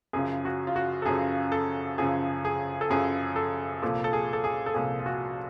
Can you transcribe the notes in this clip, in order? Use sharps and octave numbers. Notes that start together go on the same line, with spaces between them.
F#2 C#3 F3 G#4
F#4
F4
F#4
A4
F#2 C#3 F3 G#4
A4
F#2 C#3 F3 G#4
G#4
A4
F#2 C#3 F3 G#4
A4
C2 A#2 F3 A4
A4
G#4
A4
G#4
A4
C2 A#2 F3 G#4
F4
F#4